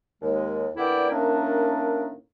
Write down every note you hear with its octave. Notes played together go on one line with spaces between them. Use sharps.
D#2 G#3
A#2 D3 B3 E4 D5 G5
A2 D#3 A#3 C#4 D4